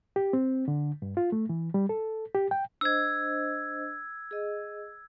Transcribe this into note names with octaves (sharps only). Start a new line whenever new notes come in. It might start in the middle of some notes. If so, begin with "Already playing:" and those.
G4
C4
D3
G2
F4
A3
E3
G3
A4
G4
G5
D4 C5 D#5 E6 G#6
G#4 D#5